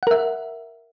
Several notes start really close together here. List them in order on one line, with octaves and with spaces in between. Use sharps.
F#5 A#4 E5